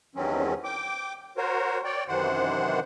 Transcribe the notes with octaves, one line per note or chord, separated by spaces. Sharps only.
E2 G2 D#3 F#3 C4 C#4
G5 D6
F#4 A#4 C5 C#5
C#5 D5 G5
F#2 C3 D#3 E3 C5 F#5